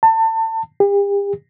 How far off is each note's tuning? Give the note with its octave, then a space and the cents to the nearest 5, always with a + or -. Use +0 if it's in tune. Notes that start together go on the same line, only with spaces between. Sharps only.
A5 +30
G4 +40